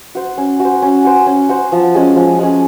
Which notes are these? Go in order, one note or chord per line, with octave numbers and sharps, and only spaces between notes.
F#4 C5
C#4
F#4
C5
C#4
F#4 C5
C#4
F#4 C5
F3
G#3 C#4
F3
G#3 C#4